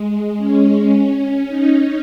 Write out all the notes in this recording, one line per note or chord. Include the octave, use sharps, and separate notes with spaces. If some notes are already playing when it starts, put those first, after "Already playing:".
Already playing: G#3
C#4
D#4